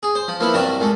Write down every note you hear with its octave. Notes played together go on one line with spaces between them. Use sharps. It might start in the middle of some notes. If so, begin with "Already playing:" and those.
G#4
C5
F3
F3 A#3 B3 E4
C2 G2 F#3 D4 A#4 A5
A#2 G#3 A3